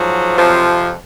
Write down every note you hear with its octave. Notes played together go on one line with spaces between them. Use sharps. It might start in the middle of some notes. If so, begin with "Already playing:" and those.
Already playing: G#2 F3 F#3
F2 C3 F3